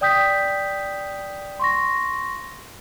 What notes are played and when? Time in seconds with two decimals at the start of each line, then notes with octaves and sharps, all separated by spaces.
0.01 D5 G5 D#6 G6 B6
1.59 C6 C#6 A#6